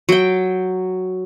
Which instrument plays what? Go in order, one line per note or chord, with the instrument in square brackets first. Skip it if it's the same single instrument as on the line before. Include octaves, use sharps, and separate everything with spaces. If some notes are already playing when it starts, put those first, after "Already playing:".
[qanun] F#3 G5